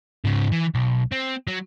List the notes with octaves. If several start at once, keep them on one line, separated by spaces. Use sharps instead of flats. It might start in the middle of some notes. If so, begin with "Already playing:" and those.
G#2 C#3
E3
B1
C4
F#3